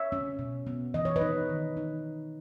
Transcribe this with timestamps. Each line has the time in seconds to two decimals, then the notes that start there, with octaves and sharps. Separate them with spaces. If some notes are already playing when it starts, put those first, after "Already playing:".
Already playing: C#5 E5
0.12 C#4
0.39 B2
0.67 B3
0.94 E3 D#5
1.05 C#5
1.16 B4 D#5
1.21 D#4
1.49 D#3
1.77 D#4